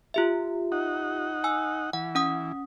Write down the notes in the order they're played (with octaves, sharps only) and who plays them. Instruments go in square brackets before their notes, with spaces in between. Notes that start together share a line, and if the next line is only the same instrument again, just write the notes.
[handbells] F4 G4 E5
[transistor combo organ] D#4 F#5
[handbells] G#5 E6
[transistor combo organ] E3 [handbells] F#5
[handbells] C#4 F#5 D#6